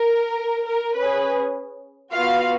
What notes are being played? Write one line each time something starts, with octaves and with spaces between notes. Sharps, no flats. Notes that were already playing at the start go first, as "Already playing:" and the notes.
Already playing: A#4
A#4
C#4 G#4 B4
B3 F4 F#4 F5